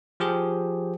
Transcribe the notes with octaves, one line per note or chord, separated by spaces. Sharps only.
F3 G4 G#4